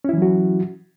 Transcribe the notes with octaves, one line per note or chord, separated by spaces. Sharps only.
E3 F#3 C#4 E4 F#4